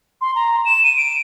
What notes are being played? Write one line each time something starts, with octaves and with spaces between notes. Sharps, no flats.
C6
A#5
E7
D#7
D7